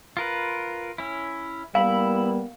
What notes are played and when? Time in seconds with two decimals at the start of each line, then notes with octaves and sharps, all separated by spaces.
0.17 F4 A#4 B4
0.98 C#4 E4
1.75 G3 A#3 B3 E4 F5 B5